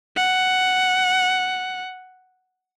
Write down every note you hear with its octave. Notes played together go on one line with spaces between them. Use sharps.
F#5